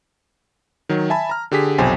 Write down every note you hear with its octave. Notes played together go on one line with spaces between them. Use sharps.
D#3 F#3
E5 G#5 A5 B5
A#5 F6
D3 G4 G#4 B6
B1 F2 C3 C5 G5 G#5